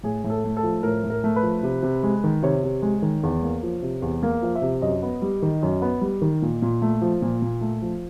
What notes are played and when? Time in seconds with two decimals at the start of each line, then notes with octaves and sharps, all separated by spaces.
0.03 A2 G#4
0.24 A2
0.30 A4
0.44 A3
0.57 A4
0.63 F3
0.83 A2 A#4
1.04 A2
1.10 A#4
1.24 A3
1.36 B4
1.43 F3
1.63 C3
1.83 C3
2.03 G#3
2.24 D#3
2.42 C3 C#5
2.64 C3
2.82 G#3
3.02 D#3
3.23 E2
3.43 A#3
3.63 F3
3.82 C3
4.02 E2
4.23 A#3
4.42 F3 F5
4.55 E5
4.62 C3
4.82 F#2 D#5
5.02 B3
5.22 G3
5.42 D#3
5.63 F#2
5.82 B3
6.01 G3
6.22 D#3
6.42 A#2
6.62 A#2
6.82 A3
7.01 F3
7.22 A#2
7.42 A#2
7.61 A3
7.82 F3